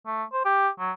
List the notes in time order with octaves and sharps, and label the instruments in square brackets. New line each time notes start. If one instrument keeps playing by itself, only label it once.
[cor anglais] A3
C5
G4
F#3